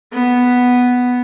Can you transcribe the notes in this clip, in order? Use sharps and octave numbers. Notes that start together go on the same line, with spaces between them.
B3